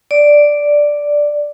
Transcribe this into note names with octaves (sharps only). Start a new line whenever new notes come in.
D5